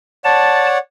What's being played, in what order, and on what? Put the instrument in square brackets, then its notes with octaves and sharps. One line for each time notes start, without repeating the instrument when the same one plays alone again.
[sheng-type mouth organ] C#5 D5 F#5 [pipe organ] A5